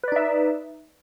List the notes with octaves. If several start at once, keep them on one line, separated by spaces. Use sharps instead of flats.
D#4 B4 D5 E5